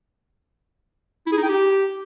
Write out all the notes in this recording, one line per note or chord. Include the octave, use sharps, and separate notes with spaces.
E4
G#4
D#4
G5
G4